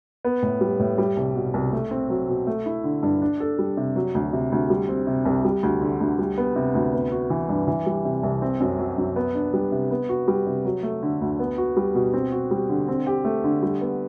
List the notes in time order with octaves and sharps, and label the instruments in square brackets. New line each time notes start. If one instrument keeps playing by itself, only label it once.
[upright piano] B3
A2
G3
A2
G3
C2
B2
C2
A3
C4
F#3
B2
A3
E4
D3
G2
D4
A4
G3
C3
F#3
D2
C3
D2
G3
C4
C3
C2
G3
D2
D3
D2
G3
B3
C3
D2
B3
F#4
E3
G2
E3
G3
C3
C2
C4
F#2
F#3
F#2
B3
D4
G3
C3
B3
F#4
G3
C3
F#3
A3
D3
D2
B3
F#4
G3
B2
C4
F#4
G3
D3
C4
G4
A3
D3
G3
B3